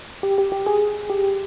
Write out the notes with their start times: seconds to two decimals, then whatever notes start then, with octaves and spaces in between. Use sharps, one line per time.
0.23 G4
0.38 G4
0.52 G4
0.66 G#4
1.10 G4